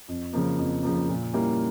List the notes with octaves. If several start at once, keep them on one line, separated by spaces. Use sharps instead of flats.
F2
C#3 F3 A#3
F2
C#3 F3 A#3
A#2
G3 A#3 C#4 E4